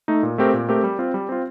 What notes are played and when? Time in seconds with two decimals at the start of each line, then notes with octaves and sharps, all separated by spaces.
0.08 A3 D#4
0.23 A#2
0.38 A3 C4 G4 A#4
0.54 A#2
0.69 A3 C4 G4 A#4
0.84 G3
0.99 C4 F4
1.14 G3
1.29 C4 F4